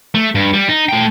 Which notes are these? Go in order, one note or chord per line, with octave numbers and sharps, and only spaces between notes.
A3
G2
G3
D#4
A3 G5